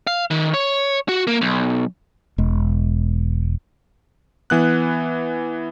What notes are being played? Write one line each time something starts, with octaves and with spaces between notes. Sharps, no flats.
F5
D#3
C#5
F#4
A#3
B1
E1 G#3
E3 B3 F#6